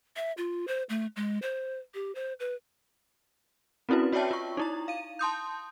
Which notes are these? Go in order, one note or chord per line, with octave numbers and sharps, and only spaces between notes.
E5
F4
C5
A3
G#3
C5
G4
C5
B4
C4 C#4 E4 F#4 B4
F#4 C#5 D5 E5 G5 A5
F4 C#6
D#4 E4 A#5
F5 D#7
A5 C6 D#6 G6